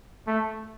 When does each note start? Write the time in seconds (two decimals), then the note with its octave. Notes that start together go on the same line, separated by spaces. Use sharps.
0.27 A3